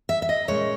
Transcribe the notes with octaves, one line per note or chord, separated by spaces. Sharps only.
E5
E5
D#5
A#2 G#3 C#4 C#5